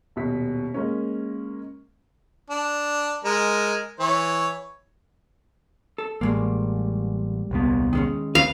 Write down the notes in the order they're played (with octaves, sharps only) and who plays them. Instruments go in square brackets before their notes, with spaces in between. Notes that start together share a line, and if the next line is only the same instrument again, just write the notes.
[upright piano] D#1 B2 B6
G#3 A#3 C#4
[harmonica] D4
G#3 A#4
E3 C#5
[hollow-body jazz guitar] A4
[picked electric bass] A1 [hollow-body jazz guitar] G3 G#3 A#3
[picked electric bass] D#1 C2 B3
[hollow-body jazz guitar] D#3 G#3 C#4
[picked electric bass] D2 [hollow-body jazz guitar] B4 [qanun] F5